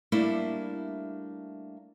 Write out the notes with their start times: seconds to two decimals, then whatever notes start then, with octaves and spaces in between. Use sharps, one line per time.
0.12 G3 A3 A#3 D4 E4